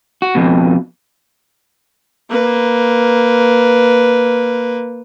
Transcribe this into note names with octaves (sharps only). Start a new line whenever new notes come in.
F#4
F2 B2
A#3 B4